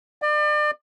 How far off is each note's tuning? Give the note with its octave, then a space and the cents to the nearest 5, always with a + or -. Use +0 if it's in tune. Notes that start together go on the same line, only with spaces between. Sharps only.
D5 +35